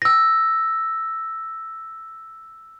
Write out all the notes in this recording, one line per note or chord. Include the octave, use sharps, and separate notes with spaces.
E6 A#6